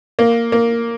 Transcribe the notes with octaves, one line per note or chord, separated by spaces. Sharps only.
A#3
A#3